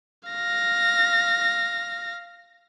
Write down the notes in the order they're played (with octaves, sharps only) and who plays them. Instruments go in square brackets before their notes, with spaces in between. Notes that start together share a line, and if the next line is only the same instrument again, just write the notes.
[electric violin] F5 A#6